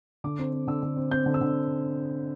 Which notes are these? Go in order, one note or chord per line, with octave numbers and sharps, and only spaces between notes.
D3 D6
C4
C4
D3 E6
D3
C4
C4 G6
D3
E6
D3